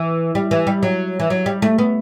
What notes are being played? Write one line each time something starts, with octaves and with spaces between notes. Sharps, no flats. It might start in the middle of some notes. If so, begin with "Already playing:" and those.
Already playing: E3
G3
E3
G3
F#3
E3
F#3
G3
A3
B3